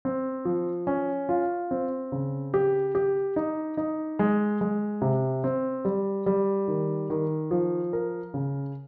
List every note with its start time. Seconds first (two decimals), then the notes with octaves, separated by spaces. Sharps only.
0.05 C4
0.45 F3
0.87 C#4
1.29 F4
1.71 C4
2.12 C#3
2.54 G4
2.95 G4
3.36 D#4
3.77 D#4
4.19 G#3
4.61 G#3
5.02 C3
5.44 C4
5.85 G3
6.26 G3
6.68 D#3
7.10 D#3
7.51 F3
7.93 A#4
8.34 C#3